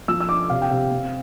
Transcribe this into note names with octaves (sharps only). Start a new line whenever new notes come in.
F3 E6
E6
D4 D6
C3 F5
G5
C3 F5
C4